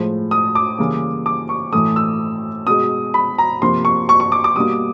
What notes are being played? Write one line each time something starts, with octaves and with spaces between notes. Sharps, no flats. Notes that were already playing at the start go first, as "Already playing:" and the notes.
Already playing: A2 F3 G#3
D#6
D6
C#3 E3 G3 A#3
D6
C#6
A2 E3 A3 D#6
E6
B2 G#3 D#6
B5
A#5
C3 F3 A#3 C6
C#6
C#6
C#6
D6
D6
B2 G3 A#3 D#6